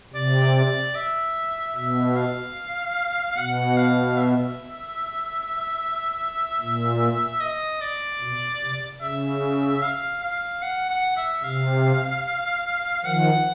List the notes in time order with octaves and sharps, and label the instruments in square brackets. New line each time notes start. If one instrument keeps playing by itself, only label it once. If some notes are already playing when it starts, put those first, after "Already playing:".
[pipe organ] C3 [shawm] D5
[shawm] D5
E5
[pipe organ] B2 [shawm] E5
[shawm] F5
[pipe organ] B2 [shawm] F#5
[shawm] F5
E5
[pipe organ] A#2
[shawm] D#5
D5
[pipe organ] B2
C3
[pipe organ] C#3 [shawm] E5
[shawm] F5
F5
F#5
F#5
E5
[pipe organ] C3 [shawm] F5
[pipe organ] D#3 F3 [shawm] F#5